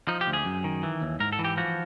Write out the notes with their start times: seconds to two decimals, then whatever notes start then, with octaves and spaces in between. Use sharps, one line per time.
0.08 F3 D#4
0.21 G4
0.27 D2
0.33 G#4
0.45 F#2
0.64 D#3
0.83 E3
1.01 D#2
1.20 G#2 A#4
1.33 A4
1.39 E3
1.45 G4
1.57 F3 F#4